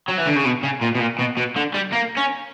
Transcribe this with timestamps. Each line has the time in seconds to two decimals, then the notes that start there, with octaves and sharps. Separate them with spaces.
0.09 F#3
0.18 E3
0.27 D3
0.36 C#3
0.46 B2
0.64 C#3
0.82 A#2
0.95 B2
1.00 A#2
1.19 B2
1.37 B2
1.57 D3
1.75 G3
1.93 A#3
2.17 C#4